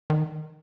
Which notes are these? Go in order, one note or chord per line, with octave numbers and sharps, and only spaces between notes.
D#3